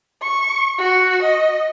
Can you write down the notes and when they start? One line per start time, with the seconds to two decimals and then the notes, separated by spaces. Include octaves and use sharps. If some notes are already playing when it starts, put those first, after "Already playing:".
0.22 C#6
0.79 F#4
1.23 D#5